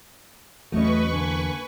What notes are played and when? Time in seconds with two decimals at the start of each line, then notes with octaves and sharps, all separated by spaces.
0.72 E2 F#3 A3 C#4 F#4 B4 D#5 C#6
1.13 D3 A#3 G#5